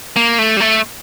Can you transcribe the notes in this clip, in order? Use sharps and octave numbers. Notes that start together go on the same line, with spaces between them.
A#3
A3
G3
A3